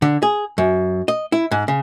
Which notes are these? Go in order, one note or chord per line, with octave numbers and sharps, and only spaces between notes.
D3
G#4
F#2
D#5
E4
G#2
C#3